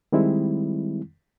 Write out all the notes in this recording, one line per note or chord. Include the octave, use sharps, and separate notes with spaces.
D#3 G3 G#3 C4 E4